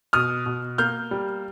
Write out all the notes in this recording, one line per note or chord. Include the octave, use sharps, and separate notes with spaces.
B2 D#6 F6
B2
A#3 F6 G6
G3